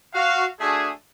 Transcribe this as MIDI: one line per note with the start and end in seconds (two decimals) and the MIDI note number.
0.14 0.45 66
0.14 0.45 77
0.59 0.91 57
0.59 0.91 62
0.59 0.91 66
0.59 0.91 68